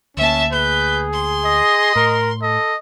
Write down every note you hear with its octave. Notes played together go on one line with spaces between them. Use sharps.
D2 A#3 C#4 E5 A5
G#4 B4 G6
C6
D#5
A2 A#4
A4 D#5